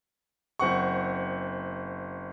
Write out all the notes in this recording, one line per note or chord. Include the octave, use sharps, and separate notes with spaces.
F#1 C4 F#5 C#6